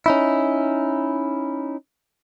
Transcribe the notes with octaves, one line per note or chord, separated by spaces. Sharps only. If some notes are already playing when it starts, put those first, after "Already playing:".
C#4 D#4 E4